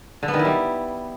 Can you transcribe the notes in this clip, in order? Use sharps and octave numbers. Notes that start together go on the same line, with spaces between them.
D3
B3
D#3
E4
G3